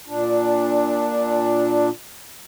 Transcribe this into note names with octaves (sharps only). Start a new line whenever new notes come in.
A#2 D4